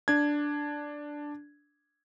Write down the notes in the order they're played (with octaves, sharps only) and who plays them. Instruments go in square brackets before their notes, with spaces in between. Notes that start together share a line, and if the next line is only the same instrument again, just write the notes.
[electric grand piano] D4 G#6